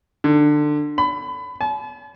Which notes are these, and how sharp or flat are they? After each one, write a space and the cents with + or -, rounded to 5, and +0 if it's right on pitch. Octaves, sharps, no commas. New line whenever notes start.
D3 +20
B5 +25
A5 -45